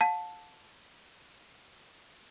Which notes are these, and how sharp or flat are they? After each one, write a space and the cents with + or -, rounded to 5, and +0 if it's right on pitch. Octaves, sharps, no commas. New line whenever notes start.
F5 +45 A5 +0